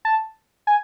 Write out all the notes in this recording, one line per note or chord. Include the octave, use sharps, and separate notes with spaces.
A5
G#5